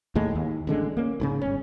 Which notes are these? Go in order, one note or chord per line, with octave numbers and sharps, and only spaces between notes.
D#2 A2 G#3
D#2
A1 D3 G#3
A#3 C#4
A1 G#2 C#3
G1 C#4